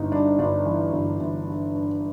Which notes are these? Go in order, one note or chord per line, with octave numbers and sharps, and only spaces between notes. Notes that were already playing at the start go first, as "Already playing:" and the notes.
Already playing: G1 G3 D#4 E4
G2 D4
G1 D4
E3
G1
G1
G2
G2